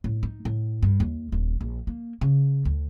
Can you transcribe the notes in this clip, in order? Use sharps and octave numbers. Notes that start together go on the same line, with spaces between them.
A2
D#4
A2
G2
D#2
D#1
A#1
A#3
C#3
D2